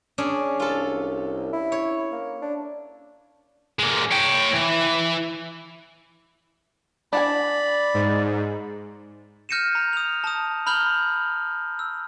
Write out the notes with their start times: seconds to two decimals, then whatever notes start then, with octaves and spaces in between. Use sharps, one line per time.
0.18 C#4 D4 G#4
0.60 C2 F4 A4
1.53 E4
1.72 C#5
2.12 A#3
2.42 D4
3.79 G#3 A#3
4.11 C#5 G5
4.54 E3
7.13 D4 D5 F#5 G#5 B5
7.94 G#2
9.49 F6 G6 A#6 C#7 D#7 E7
9.75 A#5
9.93 D#6 F7
10.24 A5 D#6
10.66 A#5 B5 F6 G6 F#7 G7
11.79 E6